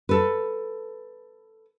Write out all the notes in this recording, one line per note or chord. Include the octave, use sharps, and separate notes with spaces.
A4 B4